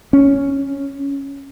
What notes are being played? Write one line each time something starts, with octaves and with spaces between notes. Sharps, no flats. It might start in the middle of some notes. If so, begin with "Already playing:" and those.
C#4